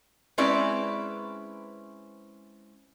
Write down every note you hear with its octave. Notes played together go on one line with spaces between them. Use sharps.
G#3 C4 C#4 E4 B4 D5